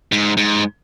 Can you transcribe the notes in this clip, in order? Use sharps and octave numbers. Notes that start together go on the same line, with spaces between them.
G#2
G#2